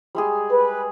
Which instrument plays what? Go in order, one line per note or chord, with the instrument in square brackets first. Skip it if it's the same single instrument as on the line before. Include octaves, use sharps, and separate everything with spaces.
[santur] G3 G#3 G#4
[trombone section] B4